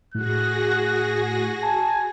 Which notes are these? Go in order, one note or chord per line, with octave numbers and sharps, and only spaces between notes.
A2 F#4 G#4 F#6 A#6
G#5 A5